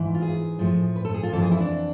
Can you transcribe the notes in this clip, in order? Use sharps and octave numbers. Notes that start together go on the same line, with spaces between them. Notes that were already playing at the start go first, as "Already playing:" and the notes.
Already playing: G#2 E3
F4
G#4
A2 F3
B4
A4
G#4
F4
F2 E3 A4
G#4
E4
D4